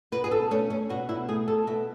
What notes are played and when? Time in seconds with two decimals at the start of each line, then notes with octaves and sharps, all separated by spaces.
0.12 B2 B4
0.24 G#4
0.31 A4
0.51 A3 C#4
0.70 C#4
0.90 B2 F#4
1.09 E4
1.28 A3 G#4
1.48 A4
1.67 B2 E5